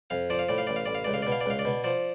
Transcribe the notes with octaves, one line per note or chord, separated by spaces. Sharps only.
F2 F5
F3 D5
F5
A2 D5
F5
A1 D5
F5
A1 D5
F5
C#2 D5
F5
B2 D5
F5
D5
C#2 F5
D5
B2
F3 D5